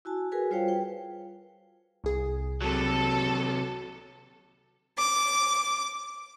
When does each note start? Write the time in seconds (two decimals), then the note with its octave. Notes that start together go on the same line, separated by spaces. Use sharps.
0.05 E4 F#4 G#5 A5
0.32 F#4 G#4 A#4 B4 G#5
0.50 G3 F4 C5 C#5 F5 G5
0.68 B4 G5
2.04 C2 G#4
2.62 C3 F#3 A4
4.99 D6